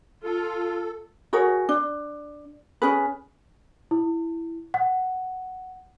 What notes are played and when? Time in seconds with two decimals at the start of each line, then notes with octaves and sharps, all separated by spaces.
0.24 F4 A4
1.33 F#4 G#4 A#4 C#5
1.69 D4
2.82 C#4 G#4 B4
3.91 E4
4.74 F#5